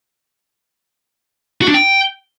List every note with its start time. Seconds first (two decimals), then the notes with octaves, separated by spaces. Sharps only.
1.62 F#4
1.68 D4
1.74 G5